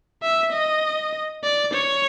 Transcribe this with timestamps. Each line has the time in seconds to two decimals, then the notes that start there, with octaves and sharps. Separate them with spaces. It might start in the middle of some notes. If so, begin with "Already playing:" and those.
0.23 E5
0.53 D#5
1.44 D5
1.74 C#5